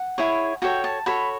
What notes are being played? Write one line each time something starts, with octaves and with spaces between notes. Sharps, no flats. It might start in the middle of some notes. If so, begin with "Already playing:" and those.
Already playing: F#5
E4 G#4 C#5
F#4 A4 C#5 G5
A5
F#4 A4 C#5 B5